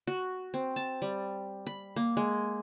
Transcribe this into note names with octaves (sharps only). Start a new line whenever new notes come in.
F#4
C4
A5
G3
B5
A#3
G#3